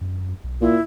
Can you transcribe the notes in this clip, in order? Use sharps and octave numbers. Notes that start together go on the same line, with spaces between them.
F#2
B1
A#2 E4